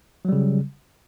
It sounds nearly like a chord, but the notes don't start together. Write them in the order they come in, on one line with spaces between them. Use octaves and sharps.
F#3 G3 C#3